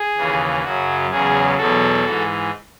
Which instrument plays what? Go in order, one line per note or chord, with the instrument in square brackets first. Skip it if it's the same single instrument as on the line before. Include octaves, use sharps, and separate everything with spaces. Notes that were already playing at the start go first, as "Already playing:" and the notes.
Already playing: [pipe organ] G#4
D#2 C#3 E3
F#2 C#3 F#3 F#4
E2 C#3 F#3 G#4
E2 B2 F#3 F#4 A4
G#2 E3